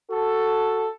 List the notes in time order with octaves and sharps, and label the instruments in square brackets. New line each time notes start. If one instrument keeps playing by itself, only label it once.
[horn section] F#4 A4